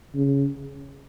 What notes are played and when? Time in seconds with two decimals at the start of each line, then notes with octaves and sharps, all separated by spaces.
0.15 C#3